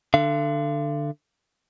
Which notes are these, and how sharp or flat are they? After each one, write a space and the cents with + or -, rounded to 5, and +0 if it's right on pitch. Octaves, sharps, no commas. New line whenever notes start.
D3 +15 F5 -40